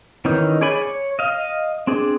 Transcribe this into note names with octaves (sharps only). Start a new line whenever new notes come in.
D#3 E3 C#4 D#4
G#4 C#5 D5 G#5 B5
C#5
D#5 F5
C4 D4 G#4